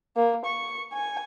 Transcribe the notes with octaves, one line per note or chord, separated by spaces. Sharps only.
A#3
C#6
G#5